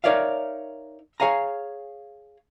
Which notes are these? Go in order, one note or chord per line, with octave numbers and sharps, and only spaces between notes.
D#4 A#4 C#5 D5 E5 F5
G#4 C#5 F5 G#5 A#5